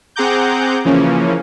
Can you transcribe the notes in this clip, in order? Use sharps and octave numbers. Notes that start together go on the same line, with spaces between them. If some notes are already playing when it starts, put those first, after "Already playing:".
C4 G#4 F#5 A#5 D6 G6
C#3 E3 F3 A#3 C#4